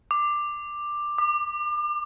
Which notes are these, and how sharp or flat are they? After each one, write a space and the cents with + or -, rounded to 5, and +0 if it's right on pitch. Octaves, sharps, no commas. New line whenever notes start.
D6 +10
D6 +35